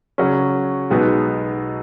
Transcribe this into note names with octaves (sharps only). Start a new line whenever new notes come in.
C#3 F#3 C#4
B1 B2 G#3 B3 D#4